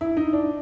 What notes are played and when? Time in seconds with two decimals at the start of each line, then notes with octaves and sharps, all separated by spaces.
0.01 E4
0.17 D#4
0.33 D4